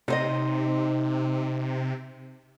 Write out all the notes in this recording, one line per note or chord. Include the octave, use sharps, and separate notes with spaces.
C3 D#4 C5 D#5